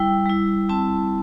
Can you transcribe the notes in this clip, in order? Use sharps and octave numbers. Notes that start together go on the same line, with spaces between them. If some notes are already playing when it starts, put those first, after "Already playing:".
Already playing: G3 E4 G5
G3 E4
G3 C4 E4 A5